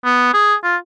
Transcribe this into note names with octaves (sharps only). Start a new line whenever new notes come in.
B3
G#4
F4